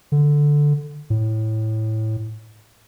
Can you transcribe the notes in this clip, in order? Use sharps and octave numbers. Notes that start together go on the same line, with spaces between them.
D3
A2